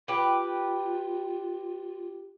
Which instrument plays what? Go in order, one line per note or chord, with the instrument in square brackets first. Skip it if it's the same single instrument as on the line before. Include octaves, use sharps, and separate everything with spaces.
[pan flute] F4 [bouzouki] G4 B4